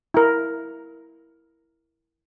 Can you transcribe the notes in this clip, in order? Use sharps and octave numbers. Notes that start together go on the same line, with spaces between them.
E4 A#4